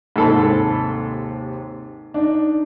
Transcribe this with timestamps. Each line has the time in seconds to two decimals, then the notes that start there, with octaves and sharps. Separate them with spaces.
0.16 D#2 G#2 C3 A4 B5
2.14 D4 D#4